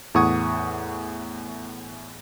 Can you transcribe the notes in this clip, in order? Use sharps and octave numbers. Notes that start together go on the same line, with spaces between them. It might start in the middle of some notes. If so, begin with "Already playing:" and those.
E2 A2 F#5 C#6 D#6 G#6